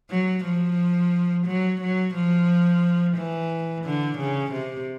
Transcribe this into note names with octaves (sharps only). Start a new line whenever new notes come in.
F#3
F3
F#3
F#3
F3
E3
D3
C#3
C3